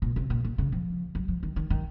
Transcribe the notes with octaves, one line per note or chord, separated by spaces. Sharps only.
A#2
C3
A#2
A#2
C#3
F3
F#3
F3
D#3
D#3
D#3